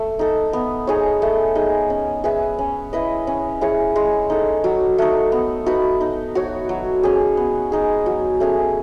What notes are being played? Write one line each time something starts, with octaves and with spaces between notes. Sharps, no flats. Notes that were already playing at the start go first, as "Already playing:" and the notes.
Already playing: A3
D#4 A4
B3
D#4 G#4 C#5
A3
D#4 G#4
C#4
G#4 B4 E5
C#4
E4 B4 D#5
C#4
E4 G#4 C#5
G#3
D#4 A4
F#3
A3 D#4
B3
D#4 F#4 B4
D#4
F#4 C#5
F#3
C#4 G#4
B3
D#4 G#4
F#3
A3 C#4 G#4